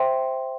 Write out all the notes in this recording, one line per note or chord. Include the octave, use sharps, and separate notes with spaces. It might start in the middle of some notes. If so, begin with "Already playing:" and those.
Already playing: C5 E5 G5 C6